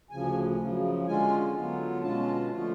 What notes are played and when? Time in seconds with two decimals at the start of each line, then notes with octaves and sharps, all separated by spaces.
0.11 D2 C#3 F3 G#5
0.58 F#2 C#3 F3
1.06 D3 G#3 C#4 F4 G#5
1.55 D3 F#3 B3 F4
2.02 B2 G#3 C#4 F4 A5
2.50 D3 F3 A3 F4